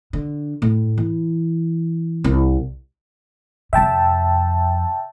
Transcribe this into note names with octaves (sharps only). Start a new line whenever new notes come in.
D3
A2
E3
C2
F2 C3 E5 G5 A5